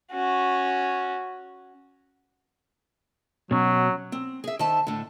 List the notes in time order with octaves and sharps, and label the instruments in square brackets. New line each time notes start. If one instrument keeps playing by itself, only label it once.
[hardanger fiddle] C#4 F#4
[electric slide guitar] B2 C#4 [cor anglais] F#3
[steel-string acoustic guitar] C4
G#4 E5
D#3 A4 C5 E5 A5
A2 D3